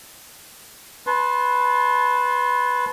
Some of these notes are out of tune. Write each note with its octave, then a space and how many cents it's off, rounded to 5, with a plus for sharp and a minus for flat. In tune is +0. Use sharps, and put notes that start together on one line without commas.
B4 +0 A5 -25 C6 +20